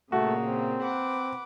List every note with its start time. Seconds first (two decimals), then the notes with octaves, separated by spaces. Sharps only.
0.12 A#2 C#3 A3 A#3 F#4
0.46 C4
0.82 B4 F#5 D6